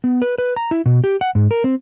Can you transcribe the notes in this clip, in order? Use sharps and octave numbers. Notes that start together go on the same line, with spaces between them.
B3
B4
B4
A#5
E4
B2
G4
F#5
G#2
A#4
C4